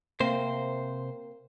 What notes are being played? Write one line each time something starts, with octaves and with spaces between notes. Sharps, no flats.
C3 A#3 C4 C5